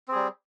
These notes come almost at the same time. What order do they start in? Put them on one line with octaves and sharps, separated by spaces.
C4 G#4 G3